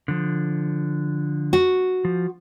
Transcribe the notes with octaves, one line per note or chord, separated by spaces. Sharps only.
D3 F3
F#4
F3